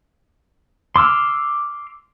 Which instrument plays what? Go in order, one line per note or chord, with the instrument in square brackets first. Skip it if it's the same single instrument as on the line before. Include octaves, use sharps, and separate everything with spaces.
[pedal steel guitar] C6 D6 E6 F6